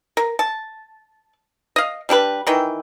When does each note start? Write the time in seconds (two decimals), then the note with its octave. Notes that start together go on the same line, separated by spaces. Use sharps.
0.17 A#4
0.39 A5
1.76 D#5 F5
2.09 G3 D4 G4 B4
2.47 D#3 E3 G5